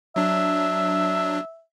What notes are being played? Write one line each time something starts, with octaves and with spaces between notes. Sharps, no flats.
F#3 D4 E5